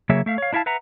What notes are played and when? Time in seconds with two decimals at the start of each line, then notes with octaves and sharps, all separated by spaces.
0.09 C#3 F#3 A#3 G#4 C#5 E5
0.26 A3 E5 F5
0.38 C#5 F5
0.53 D4 E4 E5 F5 A5
0.66 B4 E5 F#5 A#5